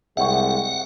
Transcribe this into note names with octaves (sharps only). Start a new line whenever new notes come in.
C2 G#3 E5 F#5 G5 C#6